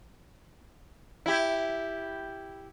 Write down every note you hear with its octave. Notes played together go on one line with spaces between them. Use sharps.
E4 G4